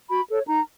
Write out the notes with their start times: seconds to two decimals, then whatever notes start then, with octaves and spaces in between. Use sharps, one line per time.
0.09 F#4 B5
0.29 A4 C#5
0.48 D#4 A#5